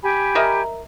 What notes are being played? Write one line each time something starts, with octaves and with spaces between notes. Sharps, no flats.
G4 G#5 B5
A#4 D#5 E5